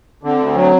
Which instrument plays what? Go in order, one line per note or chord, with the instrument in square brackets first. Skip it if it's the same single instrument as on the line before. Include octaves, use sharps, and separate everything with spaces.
[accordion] D3 [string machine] C4
[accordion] D2
F#3